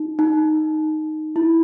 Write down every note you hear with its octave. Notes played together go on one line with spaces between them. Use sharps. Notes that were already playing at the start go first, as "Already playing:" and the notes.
Already playing: D#4
D#4
E4